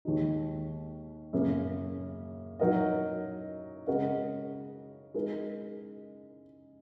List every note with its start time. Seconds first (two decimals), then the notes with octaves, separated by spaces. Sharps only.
0.05 D#2 D#3 G#3 D#4
1.33 F#2 C#3 A#3
2.59 F#3 D#4 F#4 A#4 D#5
3.87 C#3 G#3 F#4 A#4 D#5
5.14 G#3 D#4 A#4